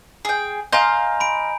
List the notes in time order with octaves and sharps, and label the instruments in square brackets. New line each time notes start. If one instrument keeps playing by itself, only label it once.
[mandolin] G#4 G5
[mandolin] D#5 F5 C6 [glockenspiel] G#5 A#5 G6
[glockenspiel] B5 D7